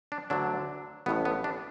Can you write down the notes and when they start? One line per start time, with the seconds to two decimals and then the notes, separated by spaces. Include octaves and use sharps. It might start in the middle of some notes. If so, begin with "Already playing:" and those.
0.12 D4
0.30 D2 D3 F#3 D4
1.06 A1 A2 A3 B3
1.25 B3
1.44 D4